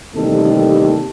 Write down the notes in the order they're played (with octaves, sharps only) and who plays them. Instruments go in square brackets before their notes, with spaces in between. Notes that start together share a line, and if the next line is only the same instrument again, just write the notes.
[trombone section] A1 D#2 C3 G3 D#4 A4